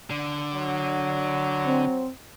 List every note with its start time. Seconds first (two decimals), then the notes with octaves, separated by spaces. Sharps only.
0.11 D3
0.53 F#3
1.66 C4